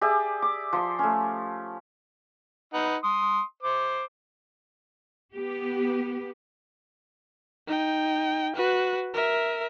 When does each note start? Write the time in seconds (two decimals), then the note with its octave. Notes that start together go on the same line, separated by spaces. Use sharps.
0.01 G4 G#4 D5 E5
0.42 D6
0.73 F3 C6
0.99 A3 C#4
2.74 D#4 B4 F#5
3.04 C6 D#6
3.63 C5 D6
5.33 B3 G4
7.67 D#4 G5
8.56 F#4 B4
9.14 A#4 E5